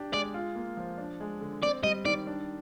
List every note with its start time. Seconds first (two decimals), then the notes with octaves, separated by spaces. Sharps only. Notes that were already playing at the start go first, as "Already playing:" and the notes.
Already playing: D4 G4
0.12 G#3 D5
0.34 F4
0.55 A#3
0.77 F3
0.98 D4
1.20 G#3
1.41 D3
1.63 C4 D5
1.83 G3 D#5
2.05 D#3 D5
2.27 D4